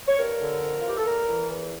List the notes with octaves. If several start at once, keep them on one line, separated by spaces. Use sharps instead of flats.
C#5
G2 A#4
D3
F2
F4
E3 G4
A4
E2 A#4
E3
E2